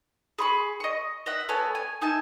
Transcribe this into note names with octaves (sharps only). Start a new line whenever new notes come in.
G#4 B5 C#6
D#5 C#6
D#5 E5 F#5
B3 A4 C#5 G#5
G#5
D#4 E5 G#5 A5